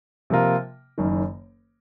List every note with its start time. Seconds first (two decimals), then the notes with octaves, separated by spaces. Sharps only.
0.30 C3 F3 A#3 F4 A#4
0.98 F#1 F#2 D#3